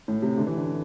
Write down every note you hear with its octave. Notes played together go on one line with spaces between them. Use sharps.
A2
C3
D3
E3
D3